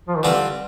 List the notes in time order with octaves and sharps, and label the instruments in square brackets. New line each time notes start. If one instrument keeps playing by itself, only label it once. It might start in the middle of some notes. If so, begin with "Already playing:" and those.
[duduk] F3
D#3
[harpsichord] D3 G3 C4 F4 [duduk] E3